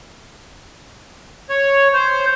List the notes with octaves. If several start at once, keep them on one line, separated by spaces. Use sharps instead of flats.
C#5
C5